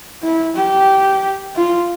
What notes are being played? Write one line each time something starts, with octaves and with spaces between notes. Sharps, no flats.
E4
G4
F4